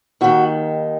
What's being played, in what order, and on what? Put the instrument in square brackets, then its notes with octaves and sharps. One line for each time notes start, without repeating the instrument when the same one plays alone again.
[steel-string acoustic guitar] D#2 D#3 F#4